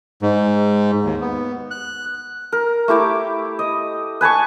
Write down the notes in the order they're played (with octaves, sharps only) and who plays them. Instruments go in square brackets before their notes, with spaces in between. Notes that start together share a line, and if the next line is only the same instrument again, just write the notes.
[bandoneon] G#2
D#2
B3
F#6
[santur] A#4
A3 E4 G4 D6
D#5
B4 G#5 A5 C#6